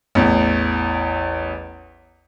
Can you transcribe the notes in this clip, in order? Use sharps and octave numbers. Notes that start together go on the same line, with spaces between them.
A1 E2